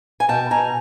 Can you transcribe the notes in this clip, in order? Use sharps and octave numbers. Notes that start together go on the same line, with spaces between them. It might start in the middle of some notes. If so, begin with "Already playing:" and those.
G#5
B2 G5 A5
B2 G#5 A#5